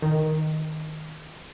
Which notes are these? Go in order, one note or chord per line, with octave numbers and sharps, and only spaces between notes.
D#3